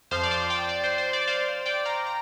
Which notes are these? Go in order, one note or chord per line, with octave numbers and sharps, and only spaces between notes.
F2 F3 C5 F5
D5
C5 F5
D5 G5
D5
C5
C5
D5
C5 F5
D5 G5
F5 A#5
A#5